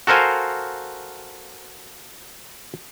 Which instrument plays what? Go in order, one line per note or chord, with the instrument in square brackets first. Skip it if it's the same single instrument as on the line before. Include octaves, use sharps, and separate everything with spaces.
[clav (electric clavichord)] F#4 A4 A#4 C5 F5 G#5